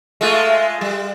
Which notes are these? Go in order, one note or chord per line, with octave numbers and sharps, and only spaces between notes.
G#3 A3 F4
G3